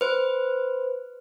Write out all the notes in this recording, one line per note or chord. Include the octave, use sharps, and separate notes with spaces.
B4 C5